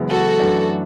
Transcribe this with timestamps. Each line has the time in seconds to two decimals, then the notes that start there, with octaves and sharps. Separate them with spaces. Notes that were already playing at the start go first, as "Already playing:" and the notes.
Already playing: F#1 F#2 E3 G#3 B3
0.10 F#4 A4
0.40 F#2 E3 A3 D4